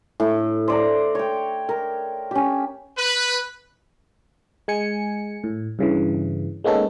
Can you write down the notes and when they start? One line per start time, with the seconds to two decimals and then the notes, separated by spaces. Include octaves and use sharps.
0.20 A2
0.68 C5 D5 A#5
1.15 C#5 G5
1.69 A#4
2.31 C#4 G4
2.98 B4
4.68 G#3 G#5 C#7
5.44 A2
5.79 G2 C#3 E3
6.64 G#3 A#3 B3 C#4 D#4 A4